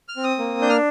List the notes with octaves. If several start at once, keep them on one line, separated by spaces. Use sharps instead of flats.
F6
C4
D#6
A#3
D4 G6
F6